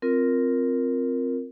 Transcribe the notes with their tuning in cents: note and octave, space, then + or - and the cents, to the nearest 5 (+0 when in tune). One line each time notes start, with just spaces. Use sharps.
C4 +0 F4 +0 A#4 +0